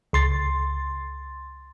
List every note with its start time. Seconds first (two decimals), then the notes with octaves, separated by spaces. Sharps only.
0.13 C#2 C6 A6